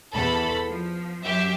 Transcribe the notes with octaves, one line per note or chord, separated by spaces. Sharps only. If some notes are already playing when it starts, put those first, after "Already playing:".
E2 A4 B5
F3
F#2 G4 E5